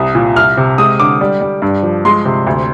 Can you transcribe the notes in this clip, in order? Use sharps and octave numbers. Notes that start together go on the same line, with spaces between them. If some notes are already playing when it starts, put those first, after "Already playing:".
Already playing: C2 C3 D#6
A#2
C2 F6
C3
G#3 D#6
D3 D6
G3
G3
G2
F3
G#3 C6
C3
D2